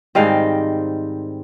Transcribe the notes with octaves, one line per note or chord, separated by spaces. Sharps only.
G#2 D#3 G3 C4 D#5 F5